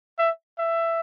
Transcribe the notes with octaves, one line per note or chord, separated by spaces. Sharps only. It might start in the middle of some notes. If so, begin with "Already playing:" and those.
E5
E5